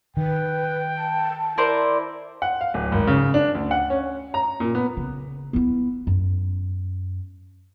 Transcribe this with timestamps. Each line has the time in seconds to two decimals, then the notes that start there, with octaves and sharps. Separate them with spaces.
0.17 D#3 B4 G5
0.97 A5
1.58 E4 A#4 C5 D5
2.42 F#5
2.61 F5
2.74 D1
2.92 G#1
3.07 C#3
3.34 D4
3.55 D2
3.71 F#5
3.90 C#4
4.34 A#5
4.60 A#2
4.75 B3
4.97 C#3
5.53 B3 E4
6.07 F#2